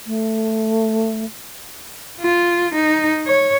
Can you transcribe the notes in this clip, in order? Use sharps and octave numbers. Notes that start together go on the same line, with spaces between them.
A3
F4
D#4
C#5